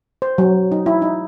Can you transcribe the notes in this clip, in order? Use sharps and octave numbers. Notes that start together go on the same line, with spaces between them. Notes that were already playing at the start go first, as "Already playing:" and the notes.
C5
F#3
D#4
E4
D#4